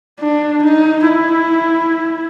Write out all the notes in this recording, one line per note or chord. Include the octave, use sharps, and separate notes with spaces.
D4
D#4
E4